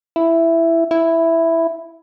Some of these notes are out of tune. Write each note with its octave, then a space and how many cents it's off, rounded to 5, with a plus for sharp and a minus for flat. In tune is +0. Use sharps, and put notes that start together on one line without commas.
E4 +5
E4 +0